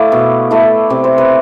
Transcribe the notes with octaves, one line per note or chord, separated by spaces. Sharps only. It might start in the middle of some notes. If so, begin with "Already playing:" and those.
Already playing: A3 E4 D5 F5
B2
A3 E4
C3 D5
C5
B4